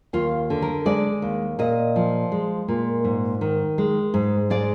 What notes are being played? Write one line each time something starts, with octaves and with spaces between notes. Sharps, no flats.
D#2 F4
D3
A#4
G#3 D5
D#2
A#2 D#5
F3
G#3
A#2
G#2
D#3
G#3
G#2
G#3 D5